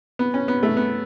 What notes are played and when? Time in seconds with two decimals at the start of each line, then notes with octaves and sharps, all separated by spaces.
0.19 B3
0.34 C#4
0.48 B3
0.63 A3
0.77 B3